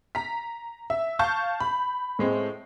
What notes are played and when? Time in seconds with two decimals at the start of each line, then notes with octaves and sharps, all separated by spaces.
0.15 A#5 B6
0.90 E5
1.19 F5 A5 C#6 G6
1.60 B5
2.19 A2 G#3 C4